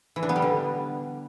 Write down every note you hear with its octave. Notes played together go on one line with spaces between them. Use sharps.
E3
D4
B3
G3
D3